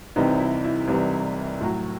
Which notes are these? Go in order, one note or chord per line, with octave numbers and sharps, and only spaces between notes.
C2 C3 E3 G3 D#4
E4
E4
C2 C3 E3 G3
A2 F#3 E4